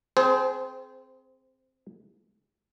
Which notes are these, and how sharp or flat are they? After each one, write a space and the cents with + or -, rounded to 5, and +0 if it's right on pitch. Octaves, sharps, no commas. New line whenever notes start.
C4 +0 G#4 +35 C5 -20